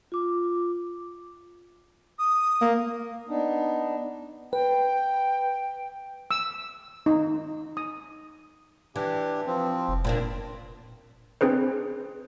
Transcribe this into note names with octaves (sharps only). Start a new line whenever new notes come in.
F4 D6
D#6
A#3
B3 D4 D#4
B4 G5
E6
D#4
D#6
E3 D4 G4
F3 C4
F1
A#2 A#3 D4
C4 D4 G#4 B4 C5